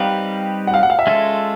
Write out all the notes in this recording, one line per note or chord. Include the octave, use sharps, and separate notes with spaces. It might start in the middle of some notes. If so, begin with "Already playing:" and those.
Already playing: G3 C4 D#4 G4 B4 F5
F#5
F5
F#5
F5
E5
G#3 C#4 F4 A4